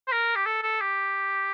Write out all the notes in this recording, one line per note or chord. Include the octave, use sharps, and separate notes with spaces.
C5
A#4
G4
A4
A4
G4